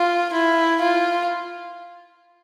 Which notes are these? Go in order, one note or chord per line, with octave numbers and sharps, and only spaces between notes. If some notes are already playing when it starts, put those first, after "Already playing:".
Already playing: F4
E4
F4